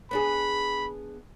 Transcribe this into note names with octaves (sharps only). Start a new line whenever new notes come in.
B3 D4 G#4 B5